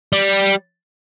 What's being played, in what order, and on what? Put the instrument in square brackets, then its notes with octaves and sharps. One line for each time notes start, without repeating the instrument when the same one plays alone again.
[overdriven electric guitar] G3